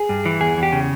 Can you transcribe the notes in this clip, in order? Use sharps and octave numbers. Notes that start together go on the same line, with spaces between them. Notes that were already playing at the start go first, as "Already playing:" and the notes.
Already playing: G#4
G2
E3
E2 G#4
E2
G4
C#3